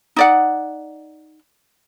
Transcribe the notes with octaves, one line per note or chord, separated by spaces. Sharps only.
D#4 D5 F#5